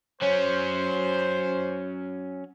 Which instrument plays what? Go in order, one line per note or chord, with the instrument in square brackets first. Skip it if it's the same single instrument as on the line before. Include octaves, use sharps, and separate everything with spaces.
[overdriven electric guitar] F#3 C#4 [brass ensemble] C5 [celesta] C#5